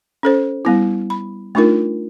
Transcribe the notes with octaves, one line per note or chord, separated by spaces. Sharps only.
C#4 A4 C5
G3 B3 E4
B5
A3 D4 D#4 F4 A#4